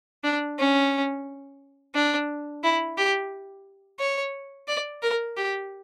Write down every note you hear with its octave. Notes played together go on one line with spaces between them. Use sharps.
D4
C#4
D4
E4
G4
C#5
D5
A#4
G4